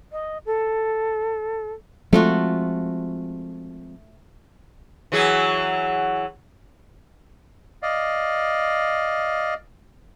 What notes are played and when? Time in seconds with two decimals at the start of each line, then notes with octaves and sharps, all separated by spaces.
0.12 D#5
0.46 A4
2.13 F3 G#3 A3 C4 F4 F#4
5.12 E3 F#3 G#4
7.82 D5 D#5 F5